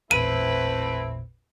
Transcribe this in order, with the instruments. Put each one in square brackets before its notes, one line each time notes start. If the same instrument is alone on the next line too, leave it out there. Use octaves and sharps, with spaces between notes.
[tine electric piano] A1 E2 A#2 [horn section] A3 C4 E4 [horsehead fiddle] B4 [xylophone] D#7